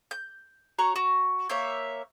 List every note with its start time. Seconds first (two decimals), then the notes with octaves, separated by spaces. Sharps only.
0.11 G6
0.79 F#4 C#5 A#5 C#6
0.96 F#4
1.50 A#3 C#5 E5 G6